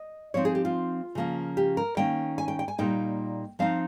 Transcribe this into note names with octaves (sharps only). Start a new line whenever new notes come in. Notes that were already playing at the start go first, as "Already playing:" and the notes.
Already playing: D#5
F3 C4 D#4 C#5
G#4
G4
F4
C#3 F3 A#3 C#4
G4
A#4
D#3 A#3 C#4 G5
G#5
G5
G5
G#5
A#2 G3 A#3 D#4 G5
F3 C4 D#4 F5